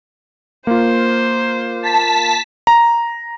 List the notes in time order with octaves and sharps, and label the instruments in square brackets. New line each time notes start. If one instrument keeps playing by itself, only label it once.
[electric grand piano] A#3 F4 [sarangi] C5
[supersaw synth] A5 B6
[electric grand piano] A#5